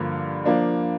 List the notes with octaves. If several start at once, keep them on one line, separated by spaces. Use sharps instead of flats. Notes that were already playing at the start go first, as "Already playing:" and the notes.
Already playing: G2 D3 F3 A#3
F3 A#3 D4